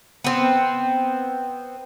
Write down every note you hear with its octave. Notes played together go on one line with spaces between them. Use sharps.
B3 C4